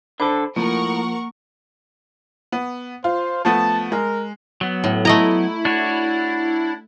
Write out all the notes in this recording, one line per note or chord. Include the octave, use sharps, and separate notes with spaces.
D3 A4 C5 B5 D6
A2 F3 A#3 A#4 F#5 C#6
B3
F4 C5
F3 A3 B3 A5
G#3 A#4
F#3 B3
A2
A3 E4 D#5 A#5
D4 F#4 C#5